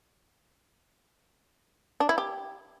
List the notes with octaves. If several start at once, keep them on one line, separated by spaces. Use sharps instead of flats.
D4
E4
G4